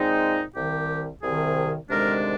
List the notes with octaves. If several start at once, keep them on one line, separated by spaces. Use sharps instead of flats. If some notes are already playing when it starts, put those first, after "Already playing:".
Already playing: A#2 G#3 C4 D#4
C2 C3 D#3 G4
C2 C3 D#3 G#4
D2 C3 D#3 G#3 D4 A#4